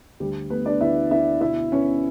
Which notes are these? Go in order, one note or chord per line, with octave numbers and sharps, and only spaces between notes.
D2 G3 G4
A3 B3 B4
D4 D5
D2 E4 E5
D2 E4 E5
B2 E4 E5
B3 C#4 C#5